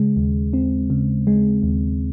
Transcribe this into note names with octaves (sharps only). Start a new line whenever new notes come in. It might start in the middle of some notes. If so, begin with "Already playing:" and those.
Already playing: C#3 G#3
D#2
C4
C#3
G#3
D#2